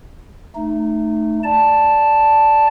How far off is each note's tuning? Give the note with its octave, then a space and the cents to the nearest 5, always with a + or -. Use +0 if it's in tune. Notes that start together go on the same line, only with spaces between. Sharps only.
A3 +0 D#4 -20
D5 -5 A5 +0